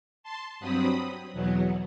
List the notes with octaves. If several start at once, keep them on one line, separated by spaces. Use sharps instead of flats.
A5 C6
G2 F#3 C4 B5 D#6
E2 B2 F#3 B3